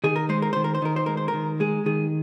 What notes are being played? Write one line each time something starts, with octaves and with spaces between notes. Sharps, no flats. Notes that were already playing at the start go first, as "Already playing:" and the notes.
D#3 G#4
A#4
G#3 C5
A#4
D#3 C5
A#4
C5
D#3 A#4
C5
G#3 A#4
C5
A#4
D#3
G#3 G#4
D#3 G#4